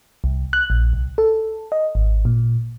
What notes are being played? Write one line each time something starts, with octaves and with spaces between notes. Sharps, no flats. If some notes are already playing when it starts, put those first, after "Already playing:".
C2
F#6
A#1
C2
A4
D#5
G#1
A#2